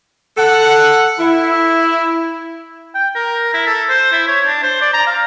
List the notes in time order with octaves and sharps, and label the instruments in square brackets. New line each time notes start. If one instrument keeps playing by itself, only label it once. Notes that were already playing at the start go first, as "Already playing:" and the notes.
[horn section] A4 F#5
E4
[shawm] G5
A#4
E4
A4
C5
E4
C#5
D4
C5
D5
A#5
F5